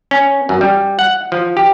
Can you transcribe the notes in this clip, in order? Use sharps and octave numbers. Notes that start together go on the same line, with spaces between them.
C#4
F#2
G3
F#5
F3
G4